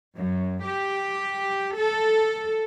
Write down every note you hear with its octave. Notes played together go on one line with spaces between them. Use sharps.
F#2
G4
A4